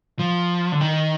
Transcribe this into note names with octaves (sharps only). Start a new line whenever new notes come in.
F3
D3
D#3